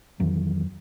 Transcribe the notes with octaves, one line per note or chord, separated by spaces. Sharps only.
F2 D#3 E3 F#3